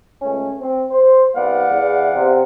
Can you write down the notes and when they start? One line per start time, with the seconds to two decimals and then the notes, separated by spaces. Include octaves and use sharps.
0.22 C#2 A3 C#4
0.60 C4
0.90 C5
1.34 C2 B3 D5 F5 F#5
1.70 E2
2.14 C3